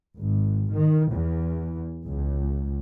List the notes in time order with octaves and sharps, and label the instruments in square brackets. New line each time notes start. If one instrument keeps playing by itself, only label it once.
[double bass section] G#1
D#3
E2
C#2